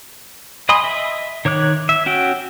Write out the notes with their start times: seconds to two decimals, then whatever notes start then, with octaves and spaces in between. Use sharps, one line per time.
0.69 D#5 G#5 B5 C6 D#6
0.84 D#5 E5
1.45 D#3 C#5 D6 F#6
1.89 E5
2.06 C#4 F#4 G5